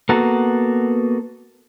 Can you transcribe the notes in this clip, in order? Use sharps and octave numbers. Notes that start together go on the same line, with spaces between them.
A#3 B3 F#4 A4